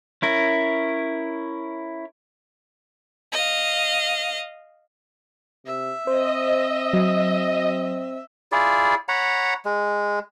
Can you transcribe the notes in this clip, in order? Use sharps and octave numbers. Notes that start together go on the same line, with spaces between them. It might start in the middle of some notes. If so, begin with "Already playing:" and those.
C#4 E4 A#4
D#5 F5
C3 E5
C4 C5 D#5
F#3
E4 F4 G#4 D5
C#5 F#5 A#5 B5
G#3